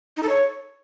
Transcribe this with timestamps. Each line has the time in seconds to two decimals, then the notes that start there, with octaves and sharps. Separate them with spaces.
0.17 D#4
0.23 A4
0.29 C#5